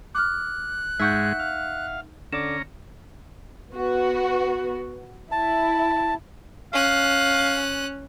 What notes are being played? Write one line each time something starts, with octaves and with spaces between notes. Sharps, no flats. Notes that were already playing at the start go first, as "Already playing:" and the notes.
D6 F6 F#6
G#2 G#3 D#4 E5 F#5 C#6 G6
F5
D3 C#4 D5 A#5 D6 E7
B3 F#4
E4 A5
C#4 F5 F#6